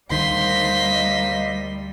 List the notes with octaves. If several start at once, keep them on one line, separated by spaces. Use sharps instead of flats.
D2 D#3 G3 A#3 C5 D#5 C6 B6